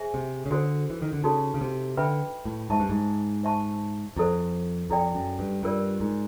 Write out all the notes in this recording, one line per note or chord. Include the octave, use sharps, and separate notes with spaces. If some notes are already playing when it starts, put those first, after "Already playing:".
Already playing: G#4 C5 E5 G#5
C3
C#3
D3 F#4 A4 C5
E3
D#3
D3
C#3 D#4 F#4 A4
C#3
C3
D3 B4 E5 G5 B5
A2
G#2 C5 E5 A5 C#6
G2
G#2
C5 E5 A5 C#6
F2 E4 A4 C5
F2 E4 A4 D5 G5
F#2
G2
G2 F4 A#4 D5
G#2